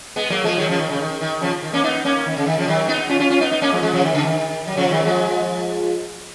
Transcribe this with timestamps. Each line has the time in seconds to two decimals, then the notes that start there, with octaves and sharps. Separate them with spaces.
0.16 G#3 B3
0.30 F#3 A#3
0.44 F3 G#3
0.58 D#3 F#3
0.69 C#3 F3
0.79 D#3
0.90 C#3
1.00 D#3
1.21 D#3
1.41 C#3 F3
1.63 D#3
1.73 A#3 C#4
1.83 B3 D#4
2.04 A#3 C#4
2.26 D#3
2.37 C#3
2.46 D#3
2.57 C#3 F3
2.67 D#3 F#3
2.88 B3 D#4
3.09 C#4 F4
3.20 C#4 F4
3.30 C#4 F4
3.40 B3 D#4
3.51 B3 D#4
3.62 A#3 C#4
3.72 F3 G#3
3.82 F3 G#3
3.94 C#3 F3
4.03 D#3
4.14 C#3
4.24 D#3
4.67 F#3
4.77 C#3 F3
4.91 D#3 F#3
5.05 F3 G#3